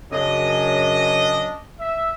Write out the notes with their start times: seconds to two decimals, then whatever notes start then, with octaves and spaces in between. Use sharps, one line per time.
0.12 F#2 C#3 D4 D#5
1.79 E5